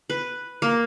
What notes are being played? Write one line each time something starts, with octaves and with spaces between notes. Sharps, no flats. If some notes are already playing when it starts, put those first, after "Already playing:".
B4
A#3